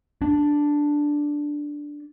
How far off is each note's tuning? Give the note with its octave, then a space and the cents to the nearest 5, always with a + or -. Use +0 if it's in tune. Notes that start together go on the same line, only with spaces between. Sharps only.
D4 +0